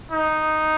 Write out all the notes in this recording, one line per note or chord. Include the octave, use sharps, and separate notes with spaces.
D#4